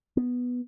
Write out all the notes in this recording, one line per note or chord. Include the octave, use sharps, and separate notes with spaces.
B3